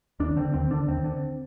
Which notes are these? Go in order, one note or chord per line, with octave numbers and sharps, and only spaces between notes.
D#2 D4
D3 C4
D#2 C4
D3 D4
D#2 C4
D3